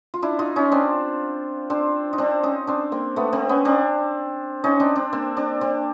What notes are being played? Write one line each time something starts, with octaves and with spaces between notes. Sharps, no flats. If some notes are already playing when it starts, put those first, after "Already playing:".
F4
D4 E4
D#4 F4
C#4 D#4
C4 D4
C4 D4
D#4
C4 D4
C#4 D#4
C4 D4
A#3 C4
A3 B3
A#3 C4
B3 C#4
C4 D4
C#4 D#4
C4 D4
C4 D4
A#3 C4
C4 D4
C4 D4